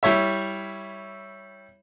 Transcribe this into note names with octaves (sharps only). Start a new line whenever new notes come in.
G3 E4 C#5 E5